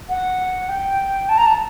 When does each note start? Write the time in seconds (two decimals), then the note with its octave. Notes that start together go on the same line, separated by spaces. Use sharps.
0.09 F#5
0.69 G5
1.29 A5
1.38 A#5
1.46 A5